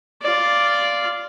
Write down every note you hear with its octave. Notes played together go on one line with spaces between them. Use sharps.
F4 D5